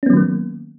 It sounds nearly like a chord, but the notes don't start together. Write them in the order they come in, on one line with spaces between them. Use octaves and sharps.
C#4 B3 F#3 D#3 A#3